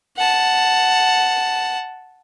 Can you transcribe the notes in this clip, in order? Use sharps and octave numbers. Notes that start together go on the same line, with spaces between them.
F#5 A5